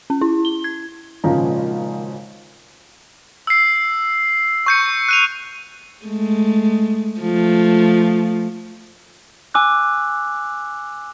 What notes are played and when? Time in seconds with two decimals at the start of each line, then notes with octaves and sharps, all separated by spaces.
0.10 C#4
0.21 E4
0.45 G7
0.64 G#6
1.24 G#1 A#2 C#3 F3 G#3 A#5
3.47 E6 C7
4.66 C#6 G6 C#7
5.09 F#6 D#7 F7
6.05 G#3 A3
7.20 F3 A3
9.54 G#5 D6 E6 F#6